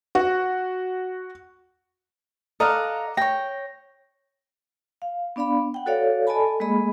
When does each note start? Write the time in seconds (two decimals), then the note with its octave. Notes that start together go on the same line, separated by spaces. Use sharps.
0.15 F#4
2.60 A4 D5 D#5 F5 F#5 A#5
3.17 C#5 G5 A#6
5.02 F5
5.36 B3 D4 D5 F5 B5
5.74 F#5 G5
5.86 F#4 A4 C#5 D5 F5
6.27 A4 D5 D#5 G#5 A5 B5
6.60 G#3 A#3 G#4 D#5 B5